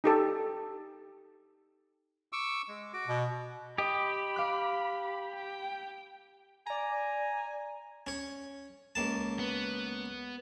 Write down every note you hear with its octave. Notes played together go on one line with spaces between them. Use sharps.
D#4 G4 A4
C#6 D6 E6
G#3
F#4 D6
B2
G4 D#5 B5
F5 D6 F#6
G5
D5 G#5 A#5
C#4 C#5
C#2 A#3 A5
B3